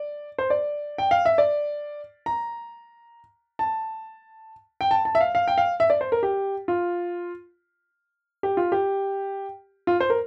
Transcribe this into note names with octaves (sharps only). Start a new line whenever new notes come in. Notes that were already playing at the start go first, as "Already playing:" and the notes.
Already playing: D5
C5
D5
G5
F5
E5
D5
A#5
A5
G5
A5
A5
E5
F5
F5
G5
F5
E5
D5
C5
A#4
G4
F4
G4
F4
G4
F4
C5
A#4